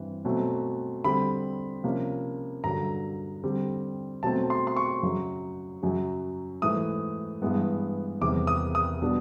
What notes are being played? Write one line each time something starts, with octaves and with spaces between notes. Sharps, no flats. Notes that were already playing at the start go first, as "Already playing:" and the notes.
Already playing: G2 E3 C4
B2 F#3 A3 C4
D3 G3 C4 B5
C3 F3 A#3 C#4
G2 D3 F#3 A#5
D3 G3 C4
B2 F#3 A3 C4 A5
C6
C6
C#6
F#2 C#3 F#3
F#2 C#3 F#3
G#2 E3 A3 D#6
G2 E3 G#3 B3
E2 C3 D#3 G3 D6
D#6
D#6
B2 G3 B3 D4